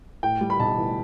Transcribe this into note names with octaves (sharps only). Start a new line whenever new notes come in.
A2 G5
G3
B5
B1 A5
E3